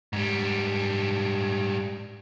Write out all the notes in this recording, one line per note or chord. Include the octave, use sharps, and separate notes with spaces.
G#2 G3